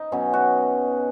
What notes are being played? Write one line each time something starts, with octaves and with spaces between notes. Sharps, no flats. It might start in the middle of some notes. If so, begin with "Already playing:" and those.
Already playing: D#4
B2 F#3 C#4
F#4